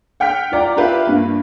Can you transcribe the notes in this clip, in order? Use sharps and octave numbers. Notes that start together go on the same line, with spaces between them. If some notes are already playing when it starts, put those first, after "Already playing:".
F#5 G5 F6 B6
F4 D5 A#5
F4 G4 B4 E5 F5
G2 A#3